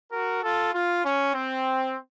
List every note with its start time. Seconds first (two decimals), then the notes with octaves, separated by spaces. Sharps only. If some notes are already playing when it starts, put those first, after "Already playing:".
0.12 F#4 A#4
0.43 F4 A4
0.74 F4
1.04 C#4
1.34 C4